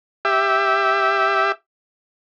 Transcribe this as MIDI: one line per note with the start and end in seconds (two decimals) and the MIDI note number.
0.25 1.52 67
0.25 1.52 76